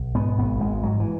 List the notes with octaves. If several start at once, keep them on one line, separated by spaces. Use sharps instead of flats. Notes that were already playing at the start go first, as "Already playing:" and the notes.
Already playing: B1
G#2 B3
G#1 B3
G#1 G#3
G#2 F#3
E3